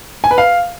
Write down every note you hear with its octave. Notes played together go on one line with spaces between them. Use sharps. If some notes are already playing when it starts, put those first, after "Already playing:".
G#5
B4
F5